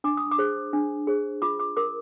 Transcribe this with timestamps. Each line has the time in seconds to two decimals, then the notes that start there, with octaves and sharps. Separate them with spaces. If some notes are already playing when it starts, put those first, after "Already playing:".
0.04 D4 D6
0.17 D#6
0.31 D6
0.38 G#4 C5
0.73 D4
1.07 G#4 C5
1.42 F4 D6
1.60 D6
1.77 A#4 D6